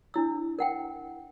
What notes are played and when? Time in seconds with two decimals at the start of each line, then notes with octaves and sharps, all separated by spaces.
0.14 D4 E4 E6
0.59 A#4 F#5 G5